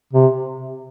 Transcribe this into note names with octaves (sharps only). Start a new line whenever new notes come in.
C3